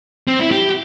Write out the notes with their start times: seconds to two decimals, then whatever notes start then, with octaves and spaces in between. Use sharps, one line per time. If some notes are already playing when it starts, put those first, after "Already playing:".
0.28 C4
0.40 E4
0.52 G4